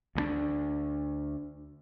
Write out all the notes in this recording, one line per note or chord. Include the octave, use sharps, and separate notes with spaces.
D2 G3 D4